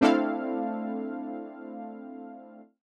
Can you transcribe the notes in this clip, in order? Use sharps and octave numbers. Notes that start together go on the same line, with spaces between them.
A3 C4 D4 E4 A4 F5